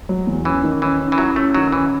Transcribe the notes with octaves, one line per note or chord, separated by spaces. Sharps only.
F#3
E2
E3 C#4
D#3
E3 C#4
C#4
E3
F#3 E4
A3 C#4
D#3 F#3
E3 C#4